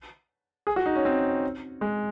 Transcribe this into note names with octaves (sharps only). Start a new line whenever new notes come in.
G#4
F#4
D#4
C#4
C4
G#3